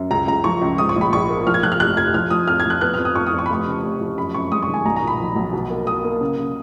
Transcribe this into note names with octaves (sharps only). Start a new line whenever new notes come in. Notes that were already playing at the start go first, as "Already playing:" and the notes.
Already playing: F#2
C#2 A#5
C#2 A#5
F3 C#6
C#2
G#2 D#6
C#6
A#1
B5
A#1 C#6
A#3
F3 F6
G#6
F3 F#6
F6
F1 F#6
F2 G#6
F3 F6
F3 D#6
F2 F6
G#6
F3 F#6
B3 F#6
F2 F6
D#6
F2 C#6
D#6
F2
C#6
B5
F1 C#6
C#3
F1
F2
F#2 B5
F#2 C#6
G#3 D#6
C#6
D#3
G#5
B1 A#5
A#5
A#2
B5
F3
B1
B2
A#3
A#3 D#6
A#3
C#3
C#3